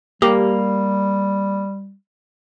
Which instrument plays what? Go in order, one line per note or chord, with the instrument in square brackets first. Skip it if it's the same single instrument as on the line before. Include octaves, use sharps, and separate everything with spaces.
[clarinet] G3 [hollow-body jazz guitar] A#3 [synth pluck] G4